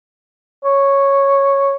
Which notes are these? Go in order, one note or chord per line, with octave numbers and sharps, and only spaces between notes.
C#5